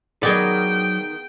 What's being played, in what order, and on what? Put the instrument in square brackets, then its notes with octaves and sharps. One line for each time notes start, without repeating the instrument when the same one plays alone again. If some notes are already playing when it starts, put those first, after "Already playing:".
[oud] D#3 [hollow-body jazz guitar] F#3 D5 [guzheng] B3 G#4 D#5 [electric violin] G5